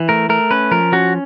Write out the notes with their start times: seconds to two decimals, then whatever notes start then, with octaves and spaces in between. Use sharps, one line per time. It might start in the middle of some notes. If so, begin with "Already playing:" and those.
Already playing: E3
0.09 A3 A#4
0.29 A3 A#4
0.51 C#4 B4
0.71 F3 A#4
0.92 C#4 F#4